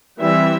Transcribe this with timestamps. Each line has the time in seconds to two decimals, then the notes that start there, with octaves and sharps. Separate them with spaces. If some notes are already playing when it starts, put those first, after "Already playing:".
0.20 E3 G3 C4 E5